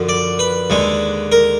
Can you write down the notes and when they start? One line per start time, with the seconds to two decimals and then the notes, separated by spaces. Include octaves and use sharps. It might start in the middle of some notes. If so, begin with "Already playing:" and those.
Already playing: F#2 D3 F3
0.09 D5
0.39 B4
0.70 D#2 D3 G#3
1.32 A#4